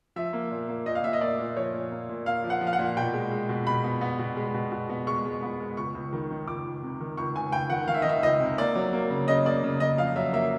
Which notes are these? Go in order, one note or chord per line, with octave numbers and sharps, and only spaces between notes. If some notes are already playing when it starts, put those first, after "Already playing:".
F3 E5
A#3
A#2
A#3
A#2 D#5
F5
A#2 E5
D#5
A#3 D5
A#2
F3 C#5
A#2
A#3
A#2
A#3 F5
F3
F#5
F3
F5
F#5
A#2
B2 G5
G#3
G#3
B2
B2 B5
B3
B3
B2
G#3
B2
B2
B3
G#3 C#6
G#3
B3
G#3
C#2 C#6
C#2
D#3
D#3
C#2 D6
C#2
C3
D#3
C#2 C#6
C#2 G#5
C#2 G5
D#3 F#5
D#3 F5
E5
D#5
D#3 E5
C#2 D#5
C3
A#3 D5
F#3
A#3
C#3
C#3 D#5
A#3 D5
C#3
C#3 D#5
F2 F5
F#3 E5
A#3 E5